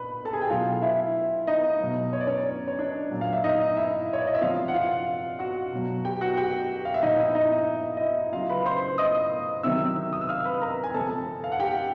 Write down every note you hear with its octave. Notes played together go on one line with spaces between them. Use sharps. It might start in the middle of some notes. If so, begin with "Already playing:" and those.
Already playing: A#2 B4 B5
A4 A5
G#4 G#5
G4 G5
B2 F#3 F4 F5
E4 E5
D#4 D#5
B2 F#3
C#5
D5
C#4 C#5
C#5
D4 D5
A#2 F#3
F5
E5
D#4 D#5
E4 E5
C#5
D5
D#5
E5
C3 F3 F4 F5
F#5
F4 F5
F#4 F#5
B2 F#3
G4 G5
F#4 F#5
G4 G5
F5
E5
A#2 F3 D#4 D#5
E4 E5
D#4 D#5
D#5
E4 E5
C#3 F#3 F4 F5
B4 B5
C5 C6
D#5 D#6
C3 D#3 F#3 E5 E6
D#6
E6
F5 F6
B4 B5
A#4 A#5
G#5
C3 F3 A4 A5
F5
F#5
G4 G5